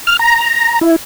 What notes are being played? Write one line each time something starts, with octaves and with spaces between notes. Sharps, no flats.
F6
A#5
E4